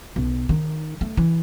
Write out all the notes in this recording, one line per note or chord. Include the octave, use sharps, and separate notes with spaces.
B1
D#3
A3
E3